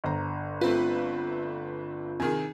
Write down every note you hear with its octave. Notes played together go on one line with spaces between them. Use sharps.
G1 C5 A#5
A3 C4 F4 B4
C3 D#3 G#4 G#5